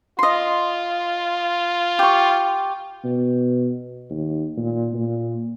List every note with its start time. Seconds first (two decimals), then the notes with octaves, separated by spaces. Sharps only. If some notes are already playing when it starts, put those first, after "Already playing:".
0.19 F4 D#5 C6
1.99 G4 C#6
3.04 B2
4.10 D#2
4.57 A#2
4.94 A#2